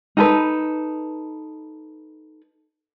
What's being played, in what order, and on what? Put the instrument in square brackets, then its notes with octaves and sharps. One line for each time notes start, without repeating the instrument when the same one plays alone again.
[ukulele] D#4 A4 B4